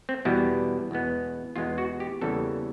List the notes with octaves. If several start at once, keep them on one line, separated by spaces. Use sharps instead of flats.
C4
E2 B2 G3 B3 E4
E2 B2 G#3 B3
E2 B2 G#3 B3 F4
F#4
G4
E2 C#3 E3 G3 A#3 A4